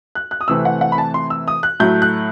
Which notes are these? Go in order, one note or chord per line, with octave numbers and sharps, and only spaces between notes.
F#6
F#6
D#6
C3 E3 A3 C4 E6
F#5
F#5
B5
A5
C6
E6
D#6
F#6
A2 F#3 A3 G6
F#6